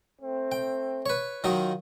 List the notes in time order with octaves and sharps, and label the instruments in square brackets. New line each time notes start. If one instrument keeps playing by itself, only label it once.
[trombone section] A3 C4
[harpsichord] G5
B4 C#5
[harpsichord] D#3 F#3 D#4 [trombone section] F4